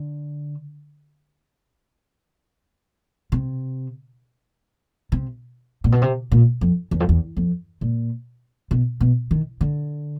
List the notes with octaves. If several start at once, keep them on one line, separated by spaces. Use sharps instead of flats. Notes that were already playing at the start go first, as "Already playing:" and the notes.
Already playing: D3
C3
C3
A#2
B2
C3
A#2
F2
E2
F2
E2
F2
A#2
B2
B2
D#3
D3